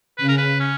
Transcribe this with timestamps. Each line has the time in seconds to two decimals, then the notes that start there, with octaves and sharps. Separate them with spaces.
0.18 C#3 B4
0.28 A#4
0.38 B4
0.60 C#4